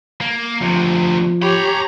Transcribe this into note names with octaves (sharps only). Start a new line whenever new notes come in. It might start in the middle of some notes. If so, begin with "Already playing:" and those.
A#3
D2 C3 F3
G4 C#5 A#5 B5